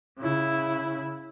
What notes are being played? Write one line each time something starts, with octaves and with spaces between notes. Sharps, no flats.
C#3 E4